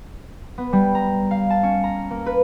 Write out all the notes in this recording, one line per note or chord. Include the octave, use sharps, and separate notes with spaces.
B3
G3
A#5
F5
A5
C#4
A#5
A#3
B4